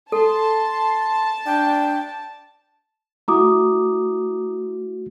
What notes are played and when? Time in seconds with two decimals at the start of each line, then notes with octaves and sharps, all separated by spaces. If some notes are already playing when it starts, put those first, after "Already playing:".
0.12 A4 A5 C6
1.46 D4 G5
3.28 A3 E4 F#4 A#5 D6 D#6